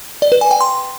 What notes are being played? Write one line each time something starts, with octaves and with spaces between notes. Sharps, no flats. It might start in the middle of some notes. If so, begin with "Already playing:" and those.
D5
B4
G#5
G5
C6